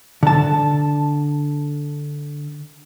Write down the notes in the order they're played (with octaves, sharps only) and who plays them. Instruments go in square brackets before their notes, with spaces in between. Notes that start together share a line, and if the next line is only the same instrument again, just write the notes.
[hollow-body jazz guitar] D3 A5